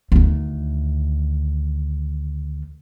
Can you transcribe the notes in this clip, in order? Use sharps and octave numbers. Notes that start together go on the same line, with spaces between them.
D2 D#3